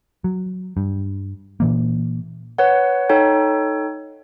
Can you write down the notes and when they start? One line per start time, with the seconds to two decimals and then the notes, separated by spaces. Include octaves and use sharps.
0.24 F#3
0.77 G2
1.60 A#2 E3 A#3
2.58 B4 C#5 F#5
3.09 D#4 A4 C#5 G5